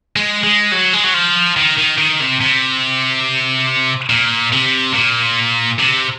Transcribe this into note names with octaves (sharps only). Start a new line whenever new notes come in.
G#3
G#3
F#3
G#3
F#3
F3
D#3
D#3
D#3
C3
C3
A#2
C3
A#2
C3